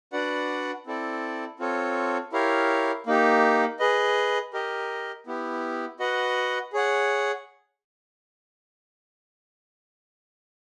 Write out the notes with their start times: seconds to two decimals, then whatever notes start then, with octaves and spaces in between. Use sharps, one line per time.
0.13 D4 F#4 B4 D5 F#5
0.86 C4 E4 A4 D5
1.59 C4 F4 A4 C#5
2.33 E4 G4 A#4 C#5 F5
3.07 A#3 D#4 G4
3.79 G#4 B4 D#5
4.53 G4 A#4 D#5
5.27 B3 E4 G4
6.00 F#4 B4 D#5 F#5
6.73 G#4 C#5 F#5